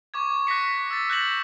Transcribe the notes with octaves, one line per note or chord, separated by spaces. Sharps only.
C#6 D6 G#6
F#6 A#6 B6 C#7
E6 A6
F#6 G6 A#6 E7 F#7